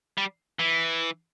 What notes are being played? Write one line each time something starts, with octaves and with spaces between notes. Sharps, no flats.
G3
E3